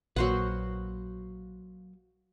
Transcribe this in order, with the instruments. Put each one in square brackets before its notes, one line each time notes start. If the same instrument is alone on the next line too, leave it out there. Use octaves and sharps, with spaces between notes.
[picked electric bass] A#1 [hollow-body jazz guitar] F#3 A#3 B4 [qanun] F#4 C5 F#5